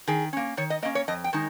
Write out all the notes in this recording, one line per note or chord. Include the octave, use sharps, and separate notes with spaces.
D#3 G#4
A#3 C#4
D#3 C#5
D#5
A#3 C#4 D#5
C#5
F2 D#5
G5
D#3 G#3 D#4